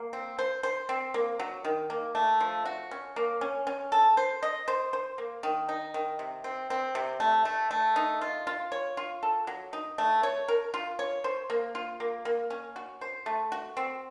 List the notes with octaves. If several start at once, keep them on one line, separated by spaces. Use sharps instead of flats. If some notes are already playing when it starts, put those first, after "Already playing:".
Already playing: A#3
C4
C5
C5
C4
A#3
F#3
D#3
A#3
A3
F3
F#4
C#4
A#3
C#4
C#4
A4
C5
D#5
C5
C5
A#3
D#3
D#4
D#3
C3
C4
C4
C3
A3
A3
A3
D#4
F4
F4
C#5
F4
A4
F#3
D#4
A3
C#5
A#4
F4
C#5
C5
A#3
F4
A#3
A#3
C#4
F#4
C5
A3
F#4
C4